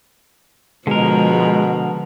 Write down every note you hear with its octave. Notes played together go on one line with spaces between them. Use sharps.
B2 D3 F3 G#3 A#4